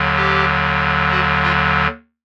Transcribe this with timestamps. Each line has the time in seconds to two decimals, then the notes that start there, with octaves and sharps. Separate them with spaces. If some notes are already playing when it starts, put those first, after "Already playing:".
Already playing: D#2 D3 F#3
0.16 G4
1.11 F#4
1.43 F4